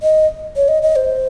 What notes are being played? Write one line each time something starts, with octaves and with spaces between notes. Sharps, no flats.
D#5
C#5
D#5
D#5
C5